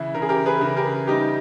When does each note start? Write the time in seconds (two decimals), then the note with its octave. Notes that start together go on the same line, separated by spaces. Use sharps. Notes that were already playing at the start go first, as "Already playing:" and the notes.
Already playing: C#3 E3 E4
0.14 C#3 A#4
0.22 G#4
0.29 G4 A#4
0.46 G#4 B4
0.61 C#3
0.77 G4 A#4
1.07 G3 D#4 G4